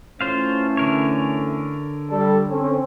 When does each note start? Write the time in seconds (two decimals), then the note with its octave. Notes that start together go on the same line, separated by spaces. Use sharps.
0.21 E3 A3 C#4 F4 C5 F5
0.77 D3 A#4 C#5
2.10 G3 A4
2.49 C4 C#4 A4